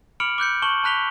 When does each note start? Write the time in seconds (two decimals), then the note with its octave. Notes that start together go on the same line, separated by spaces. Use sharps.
0.20 B5 D6 F6 C#7 D7 F#7
0.38 D6 F#6 G6 C#7
0.62 A5 C#6 E7 F#7 G7
0.84 A5 B5 F#6 B6 F7 G7